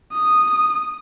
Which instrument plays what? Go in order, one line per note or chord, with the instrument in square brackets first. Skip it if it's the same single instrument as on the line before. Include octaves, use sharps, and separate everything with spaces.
[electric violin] D#6